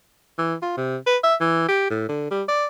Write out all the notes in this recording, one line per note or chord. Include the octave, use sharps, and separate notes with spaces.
E3
F4
C3
B4
E5
E3
G4
A2
D3
G3
D5